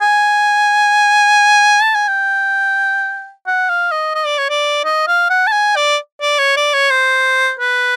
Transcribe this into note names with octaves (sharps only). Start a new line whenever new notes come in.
G#5
A5
G#5
G5
F#5
F5
D#5
D#5
D5
C#5
D5
D#5
F5
F#5
A5
G#5
D5
D5
C#5
D5
C#5
C5
B4